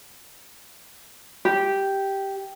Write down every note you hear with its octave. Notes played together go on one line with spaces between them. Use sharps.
G4